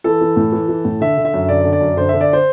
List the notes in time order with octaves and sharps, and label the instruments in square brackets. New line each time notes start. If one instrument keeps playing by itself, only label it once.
[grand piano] E3 A4
E3
A2
E3
E3
A2
D3 E5
D3
E5
F#2
D3 D5
D3
D5
F#2
D3 C5
D3 E5
D5
C5